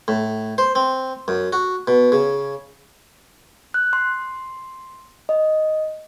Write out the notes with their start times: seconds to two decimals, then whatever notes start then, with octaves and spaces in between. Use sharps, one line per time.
0.08 A2
0.58 C5
0.75 C4
1.28 F#2
1.53 F#4
1.88 B2
2.12 C#3
3.74 F#6
3.93 C6
5.29 D#5